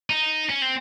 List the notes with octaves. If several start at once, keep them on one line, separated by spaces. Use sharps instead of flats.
D#4
C#4
C4